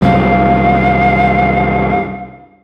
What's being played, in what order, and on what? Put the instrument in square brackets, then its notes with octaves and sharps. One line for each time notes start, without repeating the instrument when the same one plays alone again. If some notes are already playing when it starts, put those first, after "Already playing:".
[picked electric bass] C2 F#2 [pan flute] F5